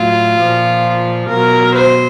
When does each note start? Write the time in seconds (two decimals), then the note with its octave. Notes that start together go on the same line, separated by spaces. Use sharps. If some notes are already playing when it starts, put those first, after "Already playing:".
Already playing: A2 F#3 F4
0.39 A#2 F3
1.29 B2 F#3 A#4
1.74 C5